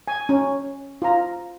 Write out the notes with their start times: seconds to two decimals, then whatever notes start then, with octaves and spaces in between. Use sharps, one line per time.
0.08 G#5
0.29 C#4
1.02 F4 A#5